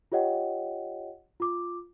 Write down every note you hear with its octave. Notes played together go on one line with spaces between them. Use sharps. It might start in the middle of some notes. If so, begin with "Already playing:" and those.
F4 G4 C#5 D#5 F#5 G5
F4 D6